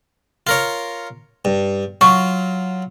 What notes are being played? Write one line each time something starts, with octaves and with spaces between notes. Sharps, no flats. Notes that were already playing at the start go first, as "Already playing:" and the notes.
F4 A#4 C#5
G2
F#3 F4 C#6